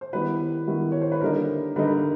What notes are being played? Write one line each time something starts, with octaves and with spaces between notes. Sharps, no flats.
C5
D#3 G3 B3 E4 B4
D#3 G3 B3 E4
C#5
C5
B4
D3 G3 A#3 D#4 A#4
D3 G3 A#3 D#4 B4